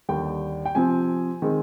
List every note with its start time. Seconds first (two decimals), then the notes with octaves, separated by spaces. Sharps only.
0.09 D#2 D3 G3 G5
0.65 G5
0.75 C3 F3 C4 G#5
1.42 D#3 G#3 C4